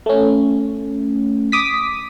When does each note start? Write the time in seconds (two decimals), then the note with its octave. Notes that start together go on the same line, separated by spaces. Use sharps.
0.06 A3 C#4
1.52 D6 D#6 B6